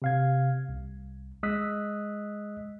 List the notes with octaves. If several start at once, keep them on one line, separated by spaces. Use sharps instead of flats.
C3 F5 G#6
C2
G#3 D#5 D#6 E6 F#6 B6